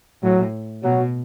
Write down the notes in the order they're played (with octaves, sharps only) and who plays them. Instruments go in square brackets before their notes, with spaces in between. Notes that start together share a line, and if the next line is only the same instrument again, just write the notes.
[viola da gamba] A2 [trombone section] F#3
[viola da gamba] B2 [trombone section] F#3